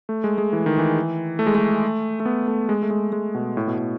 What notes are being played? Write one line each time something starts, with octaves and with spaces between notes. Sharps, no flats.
A3
G#3
G#3
E3
D#3
E3
A3
G#3
A3
A3
B3
A3
G#3
A3
G#3
G#3
B2
A2
B2
A2